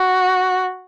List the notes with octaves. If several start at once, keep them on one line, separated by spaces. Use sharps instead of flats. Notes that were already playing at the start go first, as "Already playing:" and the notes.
Already playing: F#4